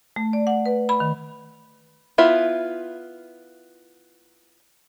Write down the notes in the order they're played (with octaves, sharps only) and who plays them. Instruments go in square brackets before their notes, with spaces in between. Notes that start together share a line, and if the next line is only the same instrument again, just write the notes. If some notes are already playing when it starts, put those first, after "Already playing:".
[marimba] A3
D5
F#5
B4
B5
D#3
[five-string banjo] B3 E4 F4 E5